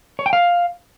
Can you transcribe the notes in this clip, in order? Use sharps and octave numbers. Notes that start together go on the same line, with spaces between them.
C#5
G5
F5